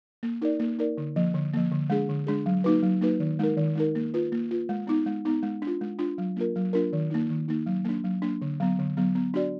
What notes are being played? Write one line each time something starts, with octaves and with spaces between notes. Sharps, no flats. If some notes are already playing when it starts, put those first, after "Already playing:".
A#3
D#4 A#4 D5
A#3
D#4 A#4 D5
D3
F3 A#3
D3
F3 A#3
D3
G#3 D4 G#4
D3
G#3 D4 G#4
F#3
A#3 D#4 F#4 B4
F#3
A#3 D#4 F#4 B4
D#3
G#3 D#4 A#4
D#3
G#3 D#4 A#4
A#3
F4 B4
A#3
F4 B4
G#3
B3 D#4
G#3
B3 D#4
G#3
D4
F4
G#3
D4 F4
F#3
A#3 D4 F4 A#4
F#3
A#3 D4 F4 A#4
D#3
A#3 D#4
D#3
A#3 D#4
F#3
A#3 D4
F#3
A#3 D4
D3
F#3 B3
D3
F#3 B3
B3
D4 F#4 D5